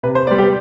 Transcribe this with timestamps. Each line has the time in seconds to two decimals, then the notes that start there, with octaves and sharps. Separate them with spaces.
0.03 C3 B4
0.15 C5
0.27 B3 D5
0.31 G3
0.38 G4